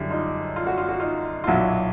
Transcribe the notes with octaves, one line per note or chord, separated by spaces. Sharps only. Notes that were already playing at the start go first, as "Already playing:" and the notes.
Already playing: F#2 D3 G3 D4 E4
D#4 F4
F4
F#4
F4
F#4
D#4 F4
F4
B1 A#2 F#3 E4 F#4